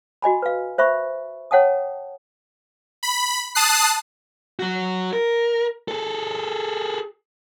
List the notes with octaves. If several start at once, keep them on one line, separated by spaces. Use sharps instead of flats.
F#4 D#5 G#5 B5
B4 F5
C5 E5 B5 C#6
C#5 F#5 G5 A5 D#6
B5
A5 D#6 F#6 C7
F#3 F#4
A#4
G#4 A4